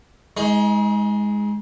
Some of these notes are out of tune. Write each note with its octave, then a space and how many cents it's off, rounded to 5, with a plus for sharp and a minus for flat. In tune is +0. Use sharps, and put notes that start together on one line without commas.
G#3 +0 D#4 +40